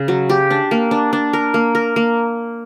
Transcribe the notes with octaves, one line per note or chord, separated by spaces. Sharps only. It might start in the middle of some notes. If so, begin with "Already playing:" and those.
Already playing: C#3
F#3
G4
D4
A#3
D4
D4
A#4
A#3
A#4
A#3